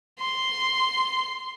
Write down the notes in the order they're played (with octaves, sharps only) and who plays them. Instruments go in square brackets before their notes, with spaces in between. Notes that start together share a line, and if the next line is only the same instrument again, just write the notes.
[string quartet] C6